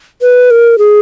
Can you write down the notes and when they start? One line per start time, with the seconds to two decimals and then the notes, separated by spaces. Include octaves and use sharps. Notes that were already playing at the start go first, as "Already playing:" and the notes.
0.22 B4
0.51 A#4
0.78 G#4